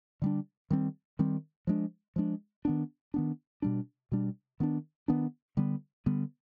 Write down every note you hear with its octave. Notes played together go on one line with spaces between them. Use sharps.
D3 G3 D4
D#3 G3 C4
D#3 G3 C4
F3 G#3 D4
F3 G#3 D4
D#3 B3 D4
D#3 B3 D4
B2 G3 D4
B2 G3 D4
D#3 B3 D4
D#3 B3 D4
D3 G3 B3
D3 G3 B3